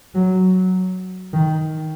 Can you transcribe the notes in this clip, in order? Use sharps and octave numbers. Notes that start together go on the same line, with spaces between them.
F#3
D#3